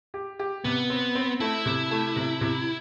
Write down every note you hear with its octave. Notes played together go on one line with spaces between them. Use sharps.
G4
G4
C3 B3
C4
C4
A3 E4
C3
A3
C3
C3